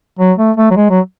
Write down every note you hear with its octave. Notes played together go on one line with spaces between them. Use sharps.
F#3
A3
A3
F#3
G#3
F#3